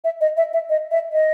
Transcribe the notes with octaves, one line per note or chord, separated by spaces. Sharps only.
E5
D#5
E5
E5
D#5
E5
D#5